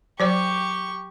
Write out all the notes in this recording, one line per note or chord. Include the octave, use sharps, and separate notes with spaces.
F#3 G4 C5 D5 C#6